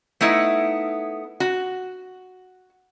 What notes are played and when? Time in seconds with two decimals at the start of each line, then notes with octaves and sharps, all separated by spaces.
0.21 A3 B3 D#4 E4
1.40 F#4